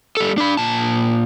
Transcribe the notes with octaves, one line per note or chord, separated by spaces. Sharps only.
G3 A4
D4 B5
A#2 A5